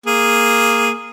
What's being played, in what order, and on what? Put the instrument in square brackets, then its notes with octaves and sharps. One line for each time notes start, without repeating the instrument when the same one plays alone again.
[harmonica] A#3 G#4